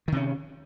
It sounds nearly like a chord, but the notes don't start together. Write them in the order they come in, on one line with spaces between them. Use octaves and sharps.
D#3 C3 C#4